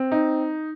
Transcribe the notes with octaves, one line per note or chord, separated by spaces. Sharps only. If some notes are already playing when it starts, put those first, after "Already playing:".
Already playing: C4
D#4